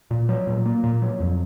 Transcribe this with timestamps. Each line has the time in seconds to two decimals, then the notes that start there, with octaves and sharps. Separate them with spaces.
0.11 A#2
0.29 F#3
0.47 A#2
0.66 A#3
0.83 A#2
1.02 F#3
1.20 F2